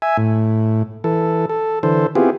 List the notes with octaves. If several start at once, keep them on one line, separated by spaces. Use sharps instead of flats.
E5 G#5
A2
E3 A4
A4
D3 E3 A4 C5
B3 C4 E4 F4 G4 G#4